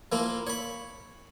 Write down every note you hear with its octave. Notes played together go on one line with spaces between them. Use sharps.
F3 A#3 E4 F4
C#5 B5